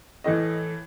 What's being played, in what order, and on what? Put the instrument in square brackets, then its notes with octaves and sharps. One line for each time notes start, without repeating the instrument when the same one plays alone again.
[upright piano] A2 E3 D#5